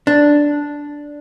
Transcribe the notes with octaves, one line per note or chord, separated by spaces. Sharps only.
D4